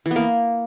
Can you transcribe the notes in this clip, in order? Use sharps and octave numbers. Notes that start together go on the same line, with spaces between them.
E3
B3
A#3